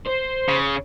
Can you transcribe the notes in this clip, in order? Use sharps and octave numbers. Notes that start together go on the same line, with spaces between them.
C5
C#3